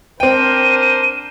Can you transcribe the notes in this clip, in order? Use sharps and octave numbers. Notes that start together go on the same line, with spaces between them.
C4 D4 A#4 C5 G5 D#7